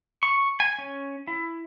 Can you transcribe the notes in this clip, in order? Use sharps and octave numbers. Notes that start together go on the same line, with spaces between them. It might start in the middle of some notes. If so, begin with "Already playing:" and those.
C#6
G#5
C#4
E4